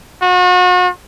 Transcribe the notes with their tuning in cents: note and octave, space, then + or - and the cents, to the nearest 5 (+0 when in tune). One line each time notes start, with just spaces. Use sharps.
F#4 -40